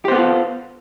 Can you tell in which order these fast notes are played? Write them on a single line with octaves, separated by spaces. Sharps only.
G4 C5 B3 A4 F4